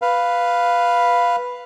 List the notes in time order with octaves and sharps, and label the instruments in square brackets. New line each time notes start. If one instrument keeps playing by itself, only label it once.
[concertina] B4 F5